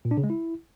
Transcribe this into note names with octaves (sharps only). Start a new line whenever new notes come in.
A#2
D4
C#3
G#3
E4